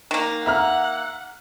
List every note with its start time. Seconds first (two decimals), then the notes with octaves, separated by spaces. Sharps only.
0.11 D#3 A#3
0.46 E5 F#5 A#5 F6